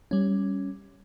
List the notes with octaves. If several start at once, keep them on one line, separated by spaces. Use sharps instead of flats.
G3 C#4